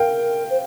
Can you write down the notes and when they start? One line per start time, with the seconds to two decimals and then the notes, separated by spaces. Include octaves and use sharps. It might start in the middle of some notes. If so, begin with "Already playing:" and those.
Already playing: A#4 F5 G5
0.50 C5